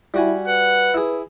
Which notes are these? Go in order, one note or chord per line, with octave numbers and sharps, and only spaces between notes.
G3 E4 F#4 G#5
B4 F#5
E4 G#4